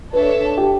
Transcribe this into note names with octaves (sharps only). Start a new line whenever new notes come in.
D4 A4 B4 C#5 E5
G4